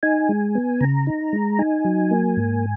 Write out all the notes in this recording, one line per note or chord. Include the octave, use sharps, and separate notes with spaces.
D#4 G#5
G#3
B3
C#3 A#5
D#4
G#3
D#4 G#5
F#3
A#3
G#2